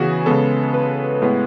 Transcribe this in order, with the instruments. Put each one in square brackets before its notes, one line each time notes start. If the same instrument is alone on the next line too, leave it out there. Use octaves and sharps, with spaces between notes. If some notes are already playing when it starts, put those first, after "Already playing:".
Already playing: [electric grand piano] C#3 E3 B3 F#4 G#4
C#3 G#3 B3 A4
B4
A2 G#3 B3